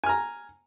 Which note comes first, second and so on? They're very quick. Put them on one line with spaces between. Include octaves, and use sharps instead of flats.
G#5 F6 A#5